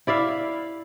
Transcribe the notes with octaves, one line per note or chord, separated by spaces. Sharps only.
E4 D5 E5 F5